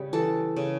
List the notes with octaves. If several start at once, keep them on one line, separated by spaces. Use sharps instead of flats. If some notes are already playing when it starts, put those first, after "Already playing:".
Already playing: C#3 G3
E3 A4 A5
C#3